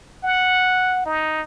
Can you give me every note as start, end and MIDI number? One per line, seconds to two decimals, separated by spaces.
0.24 1.05 78
1.06 1.42 63